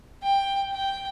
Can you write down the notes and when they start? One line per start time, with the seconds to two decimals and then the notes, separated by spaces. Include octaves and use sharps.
0.23 G5
0.72 G5